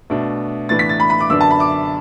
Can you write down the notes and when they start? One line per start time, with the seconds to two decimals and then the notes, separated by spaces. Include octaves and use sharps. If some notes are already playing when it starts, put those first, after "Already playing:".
0.10 B2 A3 D4
0.69 A2 E3 B3 D4 A6
0.79 B6
0.89 A6
1.00 B5
1.10 B5
1.21 D6
1.30 F#2 D3 B3 D4 E6
1.41 A5
1.51 B5
1.60 D6